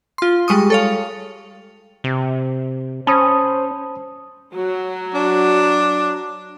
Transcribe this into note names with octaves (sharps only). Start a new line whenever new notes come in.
F4 C6
G3 G#3 C#6 D#6
A4 C#5 F5
C3
C#4 C5 A5 B5 D#6
F#3
D4